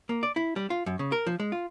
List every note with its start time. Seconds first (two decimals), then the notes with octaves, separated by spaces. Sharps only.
0.09 A#3
0.23 D5
0.36 E4
0.56 G3
0.70 F4
0.86 F#2
0.99 C#3
1.12 A#4
1.27 F3
1.40 G#3
1.52 F4